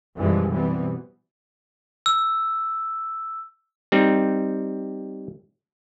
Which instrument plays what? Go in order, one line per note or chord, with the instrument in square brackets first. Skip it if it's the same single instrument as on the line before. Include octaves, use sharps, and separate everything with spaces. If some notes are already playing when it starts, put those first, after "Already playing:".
[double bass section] F#2 B2 E3 F3 G3 G#3
B2 E3 G3 B3 C4
[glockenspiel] E6
[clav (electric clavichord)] G3 C4 D#4